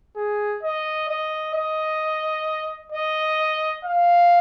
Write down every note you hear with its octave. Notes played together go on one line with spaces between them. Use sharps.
G#4
D#5
D#5
D#5
D#5
F5